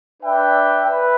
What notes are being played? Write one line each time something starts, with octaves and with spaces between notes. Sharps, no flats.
D4 B4 E5 G5
B4 E5 G5